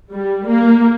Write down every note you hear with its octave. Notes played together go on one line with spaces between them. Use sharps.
G3
A#3